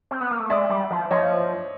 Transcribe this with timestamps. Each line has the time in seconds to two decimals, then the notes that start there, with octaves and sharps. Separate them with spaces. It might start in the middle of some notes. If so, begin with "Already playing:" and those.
0.11 C4
0.21 B3
0.31 A#3
0.40 A3
0.50 G#3 D5 E5
0.69 G3
0.91 F3
1.10 F3 C#5 D#5